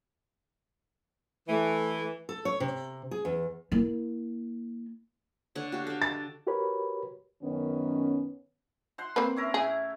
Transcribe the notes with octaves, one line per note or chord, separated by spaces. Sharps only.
E3 A3
A4
C#5
C3
G#4
E2
A#3 E4
D3 C#5 F#5
F#4 G4 F5
D4 A4
A6
F#4 G4 A#4 B4 C#5 B5
F#2 D#3 B3 C#4
C5 F#5 C6
A#3 C4 B4
C#4 E4 A#4
A2 G#4